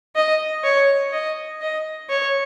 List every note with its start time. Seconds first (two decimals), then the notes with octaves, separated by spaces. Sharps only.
0.16 D#5
0.64 C#5
1.13 D#5
1.61 D#5
2.09 C#5